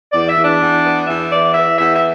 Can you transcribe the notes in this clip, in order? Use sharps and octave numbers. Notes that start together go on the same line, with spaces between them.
E2 D5
E5
E2
D4
E2
B3
E2 E5
E3 D5
E3 E5
E2 E5
E5